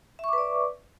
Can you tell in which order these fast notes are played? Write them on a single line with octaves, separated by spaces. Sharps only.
E5 C#6 D6 B4 D5